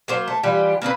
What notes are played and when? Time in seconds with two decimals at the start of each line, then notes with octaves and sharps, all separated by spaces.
0.08 F#3 A#3 C5
0.28 A3
0.43 E3 G3 F4 G4
0.82 A#3 C4 G4 B4